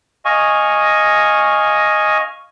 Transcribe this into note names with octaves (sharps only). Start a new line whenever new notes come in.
D#5 F5 G#5 C#6